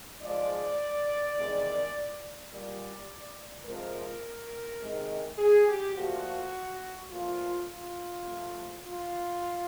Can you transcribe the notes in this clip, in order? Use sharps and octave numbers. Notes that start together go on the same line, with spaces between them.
G#2 F3 G#3 D5
E2 C3 D#3 G#3
A#2 G3 D5
F2 C3 F3 G#3 A#4
C3 D#3 G#3
G#4
G4
A#2 F3 A3 F#4
A#2 F3 A3 F4
F4
C3 F3 A3
F4